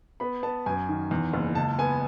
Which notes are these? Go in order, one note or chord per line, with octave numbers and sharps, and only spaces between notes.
B3 B5
B3 A5
F#2 G#5
D#3
E2
F#1
C#2 A5
B3 G#5